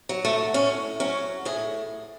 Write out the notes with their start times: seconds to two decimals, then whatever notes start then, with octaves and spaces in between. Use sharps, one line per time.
0.09 F#3
0.25 A3
0.54 A2 C#4
1.00 F#3 C#4
1.45 A2 G#4